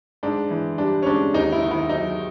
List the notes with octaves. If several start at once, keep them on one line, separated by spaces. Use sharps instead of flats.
G#2 D4
E3
G3 D4
C#4
G#2 D4
D#2 D#4
E4
D#3
E4
F#3 D#4